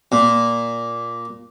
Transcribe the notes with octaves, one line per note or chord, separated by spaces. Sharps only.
A#2